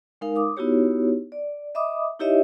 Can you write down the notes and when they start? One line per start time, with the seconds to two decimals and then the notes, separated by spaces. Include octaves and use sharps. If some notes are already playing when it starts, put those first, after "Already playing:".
0.21 G#3 D#4 A#4 F5
0.36 D6 D#6
0.57 B3 D#4 E4 F#4 G4 C#5
1.32 D5
1.75 D#5 E5 B5 D6 D#6
2.20 D#4 E4 G4 C#5 D#5 E5